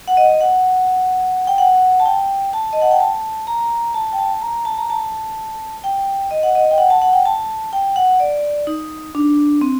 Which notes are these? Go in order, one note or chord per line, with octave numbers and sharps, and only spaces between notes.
F#5
D#5
F#5
G5
F#5
A5
G5
A5
D#5
F#5
G5
A5
A#5
A5
G5
A5
A#5
A5
A#5
A5
G5
D#5
F#5
D#5
G5
F#5
A5
F#5
G5
A5
G5
F#5
D5
D#4
D4
C4